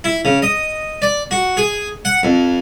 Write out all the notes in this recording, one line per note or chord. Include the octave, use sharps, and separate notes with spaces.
E4
C#3
D#5
D5
F#4
G#4
F#5
F2